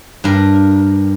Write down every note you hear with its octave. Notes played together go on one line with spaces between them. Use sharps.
G2 A#4